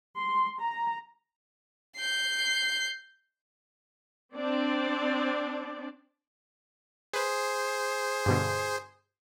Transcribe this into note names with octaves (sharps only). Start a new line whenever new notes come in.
C6
A#5
G6 C7
C4 D4 D5
G#4 B4 C5
G2 B2 D3